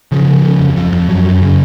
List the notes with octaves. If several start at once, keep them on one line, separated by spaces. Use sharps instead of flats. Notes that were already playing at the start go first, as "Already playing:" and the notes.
C#3 F3
C#3
C#3
F2
F2
F2
F#2 F#3
F#2
C#3